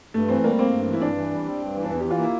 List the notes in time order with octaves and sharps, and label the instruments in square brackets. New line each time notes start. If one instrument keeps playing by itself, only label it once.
[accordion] G2 [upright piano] A3
[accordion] E3 [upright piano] C4
[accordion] G3 [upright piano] A#3
[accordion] A#3 [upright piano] C4
[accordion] G2
E3
[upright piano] E4
[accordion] G2 [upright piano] D4
[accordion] E3
G3
C4
G2
E3
[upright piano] D4
[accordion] E2 [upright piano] E4
[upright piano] G4
[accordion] E3
[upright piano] F4
[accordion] A#3 [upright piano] E4